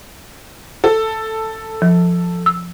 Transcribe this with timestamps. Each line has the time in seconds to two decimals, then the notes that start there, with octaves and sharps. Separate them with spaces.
0.84 A4
1.82 F3
2.46 E6